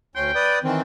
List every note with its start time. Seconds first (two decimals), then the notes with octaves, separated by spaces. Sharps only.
0.15 D2 C#4 G5 C6
0.35 B4 D5 D#6
0.64 D#3 E3 C4